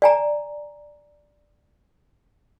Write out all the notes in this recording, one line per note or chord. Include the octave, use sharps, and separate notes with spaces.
D5 G#5 A#5